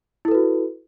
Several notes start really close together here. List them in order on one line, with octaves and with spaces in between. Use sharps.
E4 A4 B4 F#4